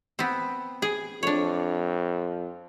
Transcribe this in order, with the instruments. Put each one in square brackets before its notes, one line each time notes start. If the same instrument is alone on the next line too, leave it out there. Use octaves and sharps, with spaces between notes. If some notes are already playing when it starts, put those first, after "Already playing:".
[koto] B3 C4
G#4
[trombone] F2 [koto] D4 C#5